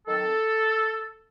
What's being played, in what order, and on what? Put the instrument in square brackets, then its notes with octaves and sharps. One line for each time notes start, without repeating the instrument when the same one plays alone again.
[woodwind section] D#3 F#3 C4 A4